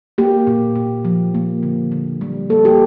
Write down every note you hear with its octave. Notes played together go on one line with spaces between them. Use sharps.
A#3 G4
A#2
A#2
F3
A#3
D3
D3
G3
A#3 A4
G4